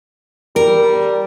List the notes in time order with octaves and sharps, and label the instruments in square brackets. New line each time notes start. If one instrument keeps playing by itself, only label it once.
[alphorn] G3 [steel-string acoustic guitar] A#4